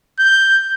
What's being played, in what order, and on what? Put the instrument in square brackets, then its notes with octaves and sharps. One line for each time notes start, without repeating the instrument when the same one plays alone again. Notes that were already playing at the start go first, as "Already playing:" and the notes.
[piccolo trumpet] G6